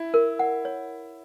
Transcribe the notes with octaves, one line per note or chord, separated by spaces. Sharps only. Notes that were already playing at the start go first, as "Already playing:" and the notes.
Already playing: E4
A#4
F#5
C#5